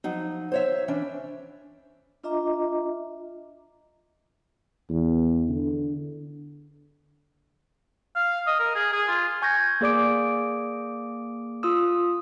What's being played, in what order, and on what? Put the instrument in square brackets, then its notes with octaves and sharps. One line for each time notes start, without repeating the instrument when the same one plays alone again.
[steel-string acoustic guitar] F3 F#3 D#4
C5 C#5 E5
E3 C#4 D4
[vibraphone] D4 F4 D#5 E5 A#5 D6
[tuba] E2
D3
[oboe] F5
D#5
A#4
G#4
G#4
F4
[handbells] G#5 C#6 G6 G#6 A#6
A#3 G#4 D5 D6 D7
F4 D#6 E6